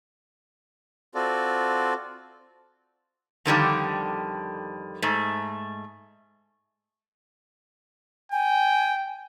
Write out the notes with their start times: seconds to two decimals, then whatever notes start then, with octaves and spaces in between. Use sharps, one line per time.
1.15 C4 F4 F#4 A4 D5
3.46 F2 D3 D#3 G3
5.02 G#2 A3
8.32 G5 G#5